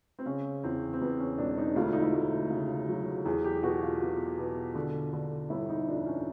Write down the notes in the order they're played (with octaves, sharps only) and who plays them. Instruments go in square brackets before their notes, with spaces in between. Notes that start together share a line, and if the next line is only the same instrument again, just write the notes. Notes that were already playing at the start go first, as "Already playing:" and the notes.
[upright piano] C4
C#3 C#4
E2 C4
C4
E2 B3
C#4
E1 D4
D#4
D2 F4
E4
D#4
E4
D2
C#3
F#3
E2 G#4
G4
B2 F#4
F4
B2
B2
D3
D3
G1 E4
D#4
F2 D4
C#4